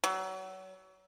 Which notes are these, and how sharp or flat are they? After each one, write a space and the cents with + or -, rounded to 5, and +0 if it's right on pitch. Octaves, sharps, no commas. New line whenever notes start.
F#3 +30